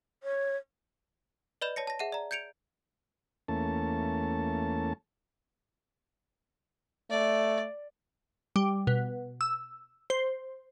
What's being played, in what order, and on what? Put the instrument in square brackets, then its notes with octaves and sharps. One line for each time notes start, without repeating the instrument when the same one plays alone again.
[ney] C#5
[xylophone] B4 D5 D#5 B5 G6 E7
C#5 A5 A#6 C#7
A5 A#6
G#4 E5 F#5 D#7
D5 A#5
G6 G#6 C#7 D7 F7
[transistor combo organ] E2 A3 A#3 C#4 A5
[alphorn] A3 [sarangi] D5
[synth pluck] G3
B2
E6
C5